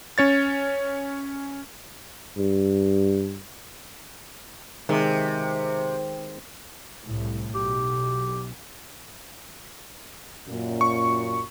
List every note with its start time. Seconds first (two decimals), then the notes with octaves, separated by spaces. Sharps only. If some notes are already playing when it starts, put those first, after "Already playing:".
0.18 C#4 C#5 A6
2.37 G2
4.89 C3 D#3 G#3 E5
7.05 C2 A2
7.55 B1 G4
10.48 F#2 A#2
10.81 C#6